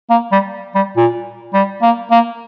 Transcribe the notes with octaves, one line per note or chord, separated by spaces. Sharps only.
A#3
G3
G3
A#2
G3
A#3
A#3